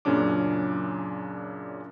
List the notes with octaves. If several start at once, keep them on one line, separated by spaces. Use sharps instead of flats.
F#2 A#2 C#3 C#4 D4 D6